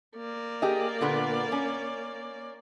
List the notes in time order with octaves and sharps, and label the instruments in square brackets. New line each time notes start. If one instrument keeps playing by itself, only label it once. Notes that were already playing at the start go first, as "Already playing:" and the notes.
[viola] A#3 D5
[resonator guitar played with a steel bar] G4 G#4 D#5
A#2 D3 B3
C#4